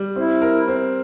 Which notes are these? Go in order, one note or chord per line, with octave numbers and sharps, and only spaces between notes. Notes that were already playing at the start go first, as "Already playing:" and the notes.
Already playing: G3
C4 E4
A#4
C4